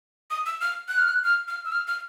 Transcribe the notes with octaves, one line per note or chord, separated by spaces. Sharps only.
D#6
E6
F6
F#6
F6
F#6
F6
F6
E6
F6
F6